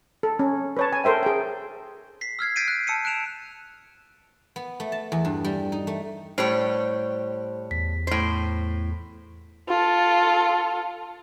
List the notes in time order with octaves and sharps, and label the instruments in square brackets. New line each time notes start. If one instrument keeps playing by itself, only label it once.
[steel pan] A4
C#4
B4 C#5 A5
G#5
A4 A#4 C5 E5 G5
G#4 G5
[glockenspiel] B6 C7
E6 F6 G#6 C7
G6 A6 B6 C7 D7 D#7
F#6
A5 E6 C#7 D#7
F#6 D7 E7 F7
[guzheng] B3
A3
A5
E2
G2
G3
D#4
A3
[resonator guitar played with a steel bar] A2 G3 C#5 [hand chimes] C5
[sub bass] E2 [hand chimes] B6
[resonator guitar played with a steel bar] A2 C5
[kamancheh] F4 A4